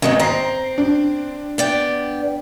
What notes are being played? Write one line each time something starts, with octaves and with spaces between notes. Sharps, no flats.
G#1 D#3 G#3 B3 D#5
C4 A#5 A#6 C7
D4
B3 D5 G5